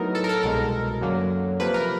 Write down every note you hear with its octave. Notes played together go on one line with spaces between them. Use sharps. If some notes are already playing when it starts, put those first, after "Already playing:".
Already playing: A2 F#3 B3 D#4 A#4
A4
A#4
A4
C2 B2 G#3 A#4
F#2 D3 F#3 A#3
C3 F3 A#3 B4
A#4